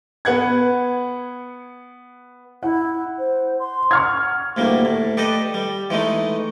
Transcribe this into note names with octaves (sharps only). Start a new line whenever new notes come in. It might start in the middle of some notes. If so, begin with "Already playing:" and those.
B3 F#5 G#6
E4 F#5
C5
C6
F#5 C#6 F6 G#6
D2 A2 G3 A#3
A2
G4 A4 B4 D5 D#5
G3
E3 G#3 A3 D#4